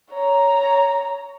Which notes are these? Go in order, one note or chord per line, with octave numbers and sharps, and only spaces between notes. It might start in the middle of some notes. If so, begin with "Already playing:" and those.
C#5 A#5